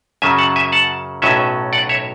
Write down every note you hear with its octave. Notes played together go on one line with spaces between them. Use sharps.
F#2 C#3 F#3 E5 G#5
F#5 A5
E5 G#5
F#5 A5
B1 A2 F#3 C#4 E5 G#5
D5 F#5
C#5 E5